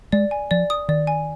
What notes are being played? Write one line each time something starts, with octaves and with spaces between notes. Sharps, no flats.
G#3 D5
G#5
F3 D5
D#6
D#3 D5
G#5